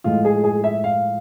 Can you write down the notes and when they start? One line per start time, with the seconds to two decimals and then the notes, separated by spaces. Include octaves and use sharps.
0.04 A2 F3 G#3 F4
0.25 G#4
0.44 G#4
0.64 E5
0.84 F5